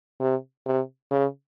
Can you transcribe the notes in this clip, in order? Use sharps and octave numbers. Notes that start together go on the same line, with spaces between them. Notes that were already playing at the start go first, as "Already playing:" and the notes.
C3
C3
C#3